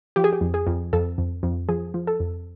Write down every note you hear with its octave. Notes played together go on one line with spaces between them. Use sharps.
F3 G4
G#4
G4
F2
G#4
F2
F2 A4
F2
F2
F3 G#4
F3
A4
F2